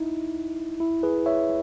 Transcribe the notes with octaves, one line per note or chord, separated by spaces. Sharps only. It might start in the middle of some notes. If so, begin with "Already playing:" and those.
Already playing: D#4 E4
E4
G#4 B4
C#5 E5